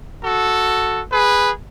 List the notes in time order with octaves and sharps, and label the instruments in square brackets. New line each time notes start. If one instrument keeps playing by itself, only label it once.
[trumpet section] F#4 A4
G#4 B4